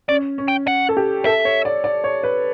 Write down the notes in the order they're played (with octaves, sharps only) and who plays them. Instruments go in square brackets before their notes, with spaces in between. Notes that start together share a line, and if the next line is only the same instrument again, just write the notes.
[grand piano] C#4 [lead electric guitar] D5
[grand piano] C#4
[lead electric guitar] G5
F#5
[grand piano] A4
G4
[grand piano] A4 [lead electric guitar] E5
[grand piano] C#5
D5
D5
C#5
B4